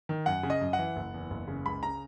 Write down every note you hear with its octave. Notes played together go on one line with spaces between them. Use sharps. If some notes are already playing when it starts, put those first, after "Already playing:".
D#3
F#2 F#5
C#3
D#5
F#2
F#5
E3
F#1
E2
F#1
C#3
C#2 B5
C#3 A#5